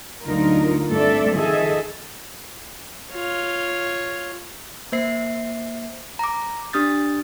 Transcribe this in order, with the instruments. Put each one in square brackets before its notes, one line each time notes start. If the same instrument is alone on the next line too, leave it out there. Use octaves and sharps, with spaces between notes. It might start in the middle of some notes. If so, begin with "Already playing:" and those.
[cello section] D2 D3 F#3 D#4 F4 A#4
G2 A3 C4 A4 D5 E5
D#3 F3 G#4 A4 D#5 E5
[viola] F4 C#5
[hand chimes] A#3 C5 E5 C7
A#5 D6
D4 G4 D#6 F6 G6 A6